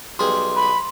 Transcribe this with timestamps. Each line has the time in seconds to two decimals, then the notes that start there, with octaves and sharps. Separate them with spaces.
0.19 B1 G3 G#4 C6
0.56 B5